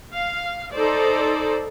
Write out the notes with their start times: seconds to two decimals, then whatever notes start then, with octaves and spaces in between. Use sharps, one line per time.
0.13 F5
0.72 D#4 A4 C5 D5